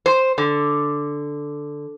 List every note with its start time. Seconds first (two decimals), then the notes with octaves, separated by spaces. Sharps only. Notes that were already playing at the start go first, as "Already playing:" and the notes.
0.06 C5
0.38 D3